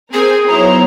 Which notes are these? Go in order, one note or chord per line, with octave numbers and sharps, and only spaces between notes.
C4 G#4 A#4 G#5
F#3 B3 D#4 E4 C5 C#5 A#5